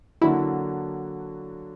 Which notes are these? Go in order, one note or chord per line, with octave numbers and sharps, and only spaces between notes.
D3 F#3 A#3 D4 E4 F#4